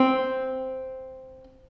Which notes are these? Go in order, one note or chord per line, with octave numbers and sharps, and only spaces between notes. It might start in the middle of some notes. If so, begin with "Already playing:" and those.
Already playing: C4